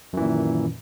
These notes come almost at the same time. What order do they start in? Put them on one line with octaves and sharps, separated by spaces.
F#2 E3 A#2 D#3